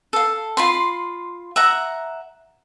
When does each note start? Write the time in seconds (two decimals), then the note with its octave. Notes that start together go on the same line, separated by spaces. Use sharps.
0.13 A4 F5
0.57 F4 B5 C6
1.56 E5 F#5 A#5